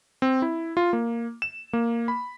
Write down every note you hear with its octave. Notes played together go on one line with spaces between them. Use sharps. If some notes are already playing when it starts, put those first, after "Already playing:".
C4
E4
F4
A#3
E7
A#3
B5